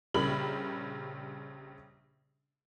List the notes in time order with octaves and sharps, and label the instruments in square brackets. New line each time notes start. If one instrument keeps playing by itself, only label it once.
[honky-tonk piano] A#1 C#3 G3 A#4 B5 F#7